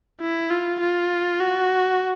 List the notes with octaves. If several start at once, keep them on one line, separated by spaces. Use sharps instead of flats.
E4
F4
F4
F#4